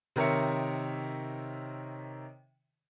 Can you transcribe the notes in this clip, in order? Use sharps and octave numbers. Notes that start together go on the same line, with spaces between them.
C3 D#3 A#4 C#5 E5 C#7